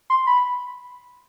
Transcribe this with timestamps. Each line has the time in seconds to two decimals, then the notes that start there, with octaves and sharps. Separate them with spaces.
0.10 C6
0.27 B5